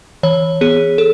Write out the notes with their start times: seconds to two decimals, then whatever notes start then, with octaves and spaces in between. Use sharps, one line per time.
0.23 E3 C#5
0.61 B3 G#4
0.98 A4